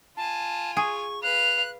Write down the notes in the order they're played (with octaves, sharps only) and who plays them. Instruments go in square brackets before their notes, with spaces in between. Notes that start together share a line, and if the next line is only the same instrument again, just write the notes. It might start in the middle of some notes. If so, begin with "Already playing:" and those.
[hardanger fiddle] F4 G#5 [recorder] A5
[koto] G#4 [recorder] C#6
[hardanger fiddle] B4 F5 [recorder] F#6 [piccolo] F7